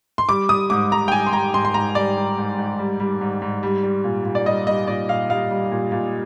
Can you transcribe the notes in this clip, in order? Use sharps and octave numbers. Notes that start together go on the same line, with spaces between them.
C6
G3 D6
G3 D#6
G#2 D6
G#2 A#5
G5
G3 G#5
C6
G3 A#5
G#2 C6
C6
G#2 A#5
G3 D5
G3
G#2
G#2
G3
G3
G#2
G#2
G3
G3
A#2
A#2
D5
G3 D#5
G3 D#5
A#2 D5
A#2 F5
G3 F5
G3
A#2
A#2